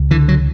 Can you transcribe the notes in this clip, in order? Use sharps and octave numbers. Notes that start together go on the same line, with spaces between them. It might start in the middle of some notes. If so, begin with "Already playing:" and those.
Already playing: C#2
D3 E3
F#3